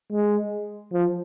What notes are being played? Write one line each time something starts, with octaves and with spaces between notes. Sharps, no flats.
G#3
F3